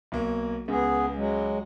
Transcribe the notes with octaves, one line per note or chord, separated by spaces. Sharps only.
B1 A#3
C#2 B3 G#4
F#3 G#3